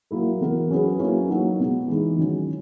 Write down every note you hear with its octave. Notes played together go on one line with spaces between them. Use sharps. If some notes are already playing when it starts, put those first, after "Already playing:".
F#3 A#3 E4 A#4
E3 B3 E4 A#4
F#3 C#4 G#4 B4
F#3 A#3 C#4 E4
F#3 A#3 D#4 F#4
B2 G#3 B3
E3 G#3 D#4
D#3 F#3 C#4